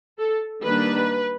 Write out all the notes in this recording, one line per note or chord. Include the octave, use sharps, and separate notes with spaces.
A4
D#3 G3 A#3 D4 B4